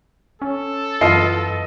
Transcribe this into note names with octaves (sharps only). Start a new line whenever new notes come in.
C#4 A4
F#2 E3 B3 F4 D#5 C7